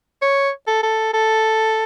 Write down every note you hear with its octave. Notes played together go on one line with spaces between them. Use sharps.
C#5
A4
A4
A4